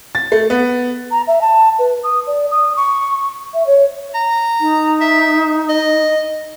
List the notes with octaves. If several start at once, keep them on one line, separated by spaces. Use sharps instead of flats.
A6
A3
B3
A#5
E5
A5
B4
D#6
D5
D#6
C#6
E5
C#5
A#5
D#4
E5
D#5